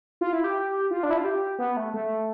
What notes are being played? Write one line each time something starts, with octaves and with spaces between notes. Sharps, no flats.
F4
E4
G4
F4
D4
E4
F4
G4
B3
A3
A3